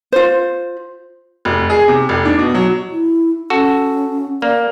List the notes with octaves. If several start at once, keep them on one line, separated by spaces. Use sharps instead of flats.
F4 C5
F1
G#4
C3
F1
D4
B2
F#3
E4
C#4 F#4 A4
A#3 D5